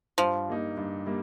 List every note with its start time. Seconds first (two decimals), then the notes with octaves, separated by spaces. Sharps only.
0.18 G2 F3
0.48 G3 A#3 D#4
0.77 G2
1.06 G3 A#3